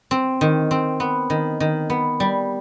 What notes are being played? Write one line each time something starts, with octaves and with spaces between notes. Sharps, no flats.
C4
D#3
C4
B3
D#3
D#3
B3
G3